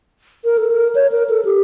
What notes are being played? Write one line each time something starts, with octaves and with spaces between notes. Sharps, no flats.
A#4
A4
A#4
C#5
A#4
A4
G4